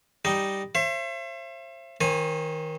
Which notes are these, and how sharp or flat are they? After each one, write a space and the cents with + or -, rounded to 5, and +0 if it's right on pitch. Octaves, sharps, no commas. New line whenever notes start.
G3 +0 D#4 +0 G5 +0
C5 +40 E5 +40
D#3 +20 C5 +45 G#5 +0